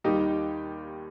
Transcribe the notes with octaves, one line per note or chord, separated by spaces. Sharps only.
D#2 D#3 G3 D#4 G4